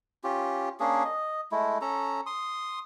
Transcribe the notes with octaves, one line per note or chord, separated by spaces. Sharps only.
C#4 F4 G4
A#3 C#4 D4 G#4
D#5
G#3 A3 E4
C#4 A4 A#5
C6 D#6